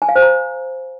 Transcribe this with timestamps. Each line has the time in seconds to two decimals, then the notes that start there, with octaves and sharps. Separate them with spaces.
0.02 G#5
0.09 F5
0.16 C5
0.22 A#5